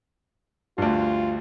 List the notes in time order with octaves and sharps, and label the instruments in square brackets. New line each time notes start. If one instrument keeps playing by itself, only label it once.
[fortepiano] D2 G2 [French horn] F4